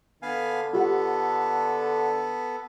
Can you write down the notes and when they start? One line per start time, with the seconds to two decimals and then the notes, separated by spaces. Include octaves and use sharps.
0.22 D3 B3 F5 G#5
0.73 B3 F4 G4 A4 F#5